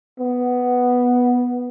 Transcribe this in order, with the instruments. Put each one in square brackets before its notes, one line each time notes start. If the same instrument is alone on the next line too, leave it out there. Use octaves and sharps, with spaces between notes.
[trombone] B3